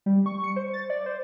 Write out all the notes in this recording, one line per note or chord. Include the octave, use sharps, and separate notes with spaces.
G3
C#6
C#7
C5
A6
D5
C5